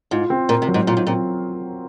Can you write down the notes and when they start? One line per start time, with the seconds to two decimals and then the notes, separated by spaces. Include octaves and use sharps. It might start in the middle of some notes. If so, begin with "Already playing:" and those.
0.11 G#2 F4
0.30 C4
0.49 A#2 A#4
0.62 C3
0.68 F#3
0.74 G#2
0.87 A#2 F4
0.97 G#2
1.07 A#2 C4